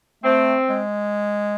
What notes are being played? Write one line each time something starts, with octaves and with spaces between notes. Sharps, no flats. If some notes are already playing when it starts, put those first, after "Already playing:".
A3 C4
G#3